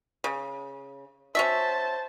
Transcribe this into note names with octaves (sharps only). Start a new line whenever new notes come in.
C#3
C#4 F#4 C5 E5 A5